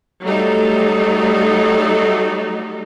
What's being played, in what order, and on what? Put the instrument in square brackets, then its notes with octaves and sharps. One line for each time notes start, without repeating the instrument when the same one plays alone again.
[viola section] F#3 G3 A3 D#4 A4